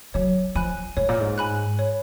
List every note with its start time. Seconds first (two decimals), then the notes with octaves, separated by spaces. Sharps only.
0.14 F#3 C#5
0.55 F3 G#5 B5 F#6
0.97 G#2 C#5
1.09 A#2
1.20 G#2
1.38 G#5 B5 F#6
1.79 C#5